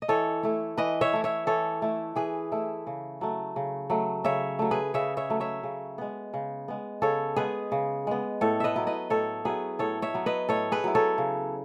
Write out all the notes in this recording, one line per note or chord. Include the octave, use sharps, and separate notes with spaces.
D#5
E3 A4 C#5
A3 E4
E3 B4 D#5
C#5 E5
A3 E4
C#5 E5
E3 A4 C#5
A3 E4
E3 G#4 B4
A3 E4
C#3
F#3 A3
C#3
F#3 A3
C#3 C#5 E5
F#3 A3
G#4 B4
C#3 C#5 E5
C#5 E5
F#3 A3
C#5 E5
C#3
G#3 B3
C#3
G#3 B3
C#3 A4 C#5
G#3 B3 G#4 B4
C#3
G#3 B3
A2 A4 C#5
B4 D#5 E5
F#3 B3 E4
B4 D#5
A2 A4 C#5
F#3 B3 E4 G#4 B4
A2 A4 C#5
C#5 E5
F#3 B3 E4
B4 D#5
A2 A4 C#5
G#4 B4
F#3 B3 E4
A4 C#5
C#3